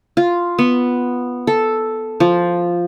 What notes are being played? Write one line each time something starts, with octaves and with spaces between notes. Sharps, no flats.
F4
B3
A4
F3